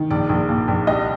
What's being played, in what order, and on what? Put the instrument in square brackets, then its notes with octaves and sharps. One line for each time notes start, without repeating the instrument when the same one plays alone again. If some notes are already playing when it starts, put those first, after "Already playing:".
Already playing: [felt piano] D#3
A#1 D5
A#1
A#2
A#1
C2 D#5